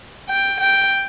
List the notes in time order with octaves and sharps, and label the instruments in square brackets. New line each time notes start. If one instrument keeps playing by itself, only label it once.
[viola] G5
G5